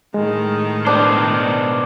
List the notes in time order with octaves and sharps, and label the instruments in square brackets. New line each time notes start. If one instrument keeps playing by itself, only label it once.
[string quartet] A2 D#3 [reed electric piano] G#3
[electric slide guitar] B2 C5 [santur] D4